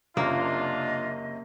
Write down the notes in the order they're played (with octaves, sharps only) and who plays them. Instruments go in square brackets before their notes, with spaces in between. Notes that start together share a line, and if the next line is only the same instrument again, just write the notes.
[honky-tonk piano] F#1 C3 C#4 [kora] A#3 [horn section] D4 F4 [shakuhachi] D#5